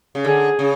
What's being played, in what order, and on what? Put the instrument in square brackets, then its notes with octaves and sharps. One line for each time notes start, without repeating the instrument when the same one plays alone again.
[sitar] C#3
[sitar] D3 [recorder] G#4
[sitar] C#3